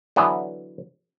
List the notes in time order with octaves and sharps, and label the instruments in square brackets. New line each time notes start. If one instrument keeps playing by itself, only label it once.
[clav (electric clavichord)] D3 E3 F#3 B3